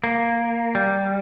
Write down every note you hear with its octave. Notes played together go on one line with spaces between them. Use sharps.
A#3
G3